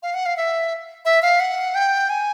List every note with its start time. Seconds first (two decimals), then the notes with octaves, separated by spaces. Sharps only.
0.03 F5
0.14 F#5
0.26 F5
0.37 E5
1.05 E5
1.22 F5
1.40 F#5
1.75 G5
2.10 G#5